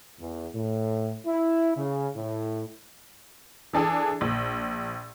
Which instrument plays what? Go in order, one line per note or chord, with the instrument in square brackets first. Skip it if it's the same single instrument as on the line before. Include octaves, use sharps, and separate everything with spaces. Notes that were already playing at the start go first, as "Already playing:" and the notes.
[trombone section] E2
A2
E4
C#3
A2
[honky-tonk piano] E3 D4 G#4 A4
A#1